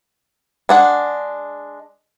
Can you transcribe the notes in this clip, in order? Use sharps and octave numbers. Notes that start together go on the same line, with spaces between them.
G#3 D4 F#5